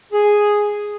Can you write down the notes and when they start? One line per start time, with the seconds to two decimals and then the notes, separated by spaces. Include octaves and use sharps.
0.13 G#4